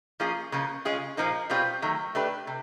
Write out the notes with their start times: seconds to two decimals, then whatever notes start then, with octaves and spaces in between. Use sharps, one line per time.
0.20 F3 A#3 C#4 F4 G#4
0.52 C#3 F3 A#3
0.85 G#3 C#4 F4 G#4
1.17 A#2 F3 A#3 D#4
1.50 B2 G3 C4 F4 G#4
1.82 D#3 F#3 A3
2.15 A3 D4 G4 B4
2.47 C3